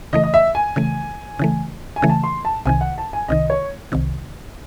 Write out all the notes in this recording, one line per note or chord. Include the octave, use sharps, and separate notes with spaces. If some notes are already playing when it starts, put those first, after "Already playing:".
C#3 E3 A3 D#5
D#5
E5
G#5
C#3 E3 A3
C#3 E3 A3
G#5
C#3 E3 A3
A5
C6
A5
C2 C3 D#3 G#5
F#5
A5
G#5
C2 C3 D#3 D#5
C#5
C2 C3 D#3